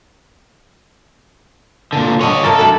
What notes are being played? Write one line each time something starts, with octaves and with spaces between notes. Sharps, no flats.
A#2 D3
D3 G3 C#5 D#5
C3 A#3 A4 A#4 A5
F#3 D4 E4